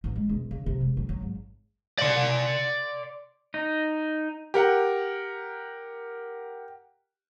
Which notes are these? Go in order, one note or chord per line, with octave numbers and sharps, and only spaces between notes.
A1
G#3
E1
C#3
C3
E1
F#3
F#3
G#1
D5 C6
D#4
G4 A#4 F#5